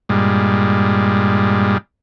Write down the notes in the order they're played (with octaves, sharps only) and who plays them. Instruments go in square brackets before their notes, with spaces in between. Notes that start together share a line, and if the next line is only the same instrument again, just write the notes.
[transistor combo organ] G2 A#2 G3 G#3